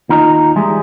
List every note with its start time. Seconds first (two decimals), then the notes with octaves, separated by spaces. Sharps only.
0.09 D#2 D#4 F4 D#5 A#5
0.56 E3 G3 G#3